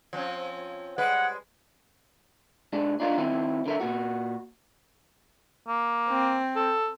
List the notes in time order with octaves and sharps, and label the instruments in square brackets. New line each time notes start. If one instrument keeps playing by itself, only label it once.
[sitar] F3 C4 C#4
[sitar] G3 G#3 B4 [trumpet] F#5
[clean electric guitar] G#2 G#3 D4
D4 D#4 F4 A#4
D#3 C4 E4
D3 A#4 E5
A#2 F#4
[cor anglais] A#3
[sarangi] C4
[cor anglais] A4